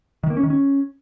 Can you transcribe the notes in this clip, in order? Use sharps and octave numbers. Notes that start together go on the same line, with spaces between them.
D#3
A#3
C#4
D#3
C#4